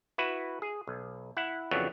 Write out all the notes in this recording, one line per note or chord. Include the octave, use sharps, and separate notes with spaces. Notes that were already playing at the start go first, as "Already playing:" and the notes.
E4 F#4 B4
G#4
B1
E4 F#5
F2 C#3 E3 F#3 B3 D4